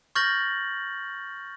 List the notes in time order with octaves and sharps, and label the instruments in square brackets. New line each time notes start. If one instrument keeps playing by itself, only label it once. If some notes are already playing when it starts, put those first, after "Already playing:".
[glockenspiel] C#6 F6 G6 A6 A#6 F#7